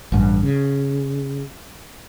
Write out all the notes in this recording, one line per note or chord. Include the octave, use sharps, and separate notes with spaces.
A1 G2
C#3